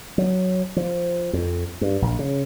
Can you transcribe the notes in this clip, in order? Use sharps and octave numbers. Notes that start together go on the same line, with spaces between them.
F#3
F3
F2
G2
A#1
C#3